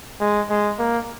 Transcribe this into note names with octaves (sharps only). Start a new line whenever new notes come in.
G#3
G#3
A#3